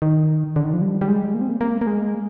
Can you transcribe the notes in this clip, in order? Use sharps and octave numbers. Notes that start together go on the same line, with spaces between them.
D#3
D3
D#3
F3
G3
G3
G#3
A#3
C4
A#3
A#3
A#3
G#3